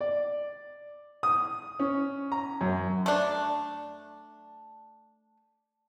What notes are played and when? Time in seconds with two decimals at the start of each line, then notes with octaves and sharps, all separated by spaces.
0.01 D5
1.23 D#6
1.79 C#4
2.32 A#5
2.61 F#2
3.06 A3 D4